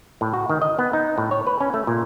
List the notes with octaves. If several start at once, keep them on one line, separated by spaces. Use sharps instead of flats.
A2
F#4
D#3
D#5
B3
D#4
A2
C#5
B4
C#4
A3
A#2